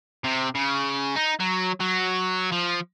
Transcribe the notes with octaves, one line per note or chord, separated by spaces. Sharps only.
C3
C#3
D#4
F#3
F#3
F3